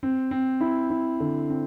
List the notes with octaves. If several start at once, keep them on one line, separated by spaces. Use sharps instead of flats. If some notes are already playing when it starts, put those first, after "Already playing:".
C4
C4
E4
E4
D3
C4